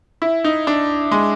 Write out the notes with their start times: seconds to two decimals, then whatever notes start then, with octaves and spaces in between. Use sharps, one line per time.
0.22 E4
0.44 D#4
0.67 D4
1.11 G#3